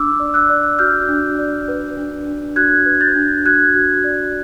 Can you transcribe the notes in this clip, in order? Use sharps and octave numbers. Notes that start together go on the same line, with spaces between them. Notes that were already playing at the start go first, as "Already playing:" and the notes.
Already playing: D4 D6 E6
D5
E6 F#6
D5
F#4 F6 G6
D4
D5
B4
D4
D4
F#4 F#6 G#6
B4
G6 A6
D4
F#4 F#6 G#6
F#4
D5